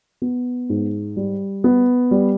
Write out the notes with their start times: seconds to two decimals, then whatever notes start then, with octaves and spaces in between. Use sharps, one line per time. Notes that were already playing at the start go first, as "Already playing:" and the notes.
0.22 B3
0.69 G#2
1.17 G3
1.64 B3
2.11 G3